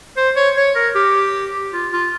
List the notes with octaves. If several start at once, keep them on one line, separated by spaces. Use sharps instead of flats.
C5
C#5
C#5
A#4
G4
F4
F4